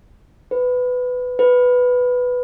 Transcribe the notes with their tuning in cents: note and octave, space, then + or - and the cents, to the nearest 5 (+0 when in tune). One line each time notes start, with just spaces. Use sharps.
B4 +15
B4 +5